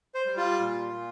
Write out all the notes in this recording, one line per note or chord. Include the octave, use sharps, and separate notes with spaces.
C5
G3
F4
A#2
A#2